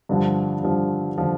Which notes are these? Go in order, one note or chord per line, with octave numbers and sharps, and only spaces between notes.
G2 D3 F3
G2 D3 F3
D3 F3